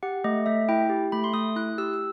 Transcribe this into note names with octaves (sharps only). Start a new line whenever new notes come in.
G4 F#5
A3 D#5
A3 E5
E4 G5
G4
A3 B5
C6
A3 D#6
E4 F#6
G4 E6
E6